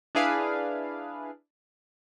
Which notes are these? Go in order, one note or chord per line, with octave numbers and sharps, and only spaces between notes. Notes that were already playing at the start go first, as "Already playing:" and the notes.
D4 E4 G#4 B4 F5